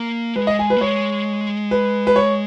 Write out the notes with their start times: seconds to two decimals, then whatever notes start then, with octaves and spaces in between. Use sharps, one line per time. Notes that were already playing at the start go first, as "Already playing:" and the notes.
Already playing: A#3
0.36 G#3 B4
0.47 D#5
0.59 G#5
0.70 B4
0.77 A#3
0.81 G#3 C#5
1.71 B4
2.07 B4
2.16 C#5